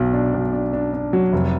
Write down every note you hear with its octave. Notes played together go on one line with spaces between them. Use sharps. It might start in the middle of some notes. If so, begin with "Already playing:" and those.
Already playing: B1 B2
D4
B1
D4
D4
D4
F#3
F1